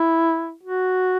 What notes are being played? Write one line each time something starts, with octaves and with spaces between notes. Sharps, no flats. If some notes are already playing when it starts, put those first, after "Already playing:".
Already playing: E4
F#4